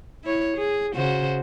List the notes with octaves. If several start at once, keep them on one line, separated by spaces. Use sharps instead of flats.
E4 C#5
G#4
C#3 F#4 C5